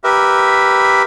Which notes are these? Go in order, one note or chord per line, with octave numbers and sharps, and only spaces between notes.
G4 A#4 B4 E5